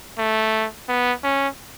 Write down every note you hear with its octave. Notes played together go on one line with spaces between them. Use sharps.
A3
B3
C#4